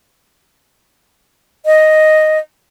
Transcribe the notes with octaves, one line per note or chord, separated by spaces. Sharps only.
D#5